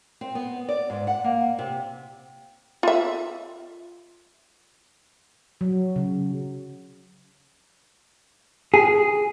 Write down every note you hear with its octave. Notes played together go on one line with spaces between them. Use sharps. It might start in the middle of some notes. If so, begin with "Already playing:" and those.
C4
B3
D5
G#2
F#5
A#3
C3
F4 E5
F#3
C#3
G#4